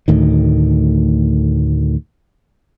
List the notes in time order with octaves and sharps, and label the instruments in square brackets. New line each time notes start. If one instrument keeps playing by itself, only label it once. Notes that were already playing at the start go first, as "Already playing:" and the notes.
[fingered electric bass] D2 A2 D#3